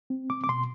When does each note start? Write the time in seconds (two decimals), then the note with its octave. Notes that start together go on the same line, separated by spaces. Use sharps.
0.10 C4
0.30 D6
0.44 D6
0.49 B2 C6